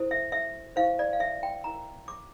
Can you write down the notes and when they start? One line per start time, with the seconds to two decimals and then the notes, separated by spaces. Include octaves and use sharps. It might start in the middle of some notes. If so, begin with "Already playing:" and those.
Already playing: E4 A4 C5
0.11 E5
0.32 E5
0.76 E4 G4 C5 F5
0.99 D5
1.13 F5
1.20 E5
1.43 G5
1.64 E4 A#4 A#5
2.08 D6